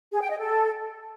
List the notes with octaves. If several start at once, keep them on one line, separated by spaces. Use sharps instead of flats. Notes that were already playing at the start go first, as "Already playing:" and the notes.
G#4
G5
D#5
A4